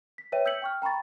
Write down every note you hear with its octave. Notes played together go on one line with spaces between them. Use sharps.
B6
B4 C#5 E5 G5 D#7
E6 G6 G#6 B6 C#7 F#7
G5 C#6 F6
G5 A#5 B5 C#6 A6